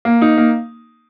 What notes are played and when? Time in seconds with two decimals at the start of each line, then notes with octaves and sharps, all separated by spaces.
0.05 A#3
0.22 D#4
0.38 A#3